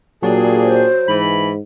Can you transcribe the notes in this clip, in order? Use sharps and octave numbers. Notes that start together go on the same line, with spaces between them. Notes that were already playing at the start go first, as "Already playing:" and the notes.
A#2 F#3 D4 G4 G#4
C5
G#2 E3 B5